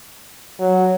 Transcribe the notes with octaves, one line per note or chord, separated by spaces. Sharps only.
F#3